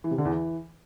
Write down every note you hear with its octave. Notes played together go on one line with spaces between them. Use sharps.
E3
C3
D3
E2
E3